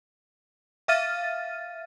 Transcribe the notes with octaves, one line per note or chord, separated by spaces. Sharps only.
E5 F5 F6 A6 D#7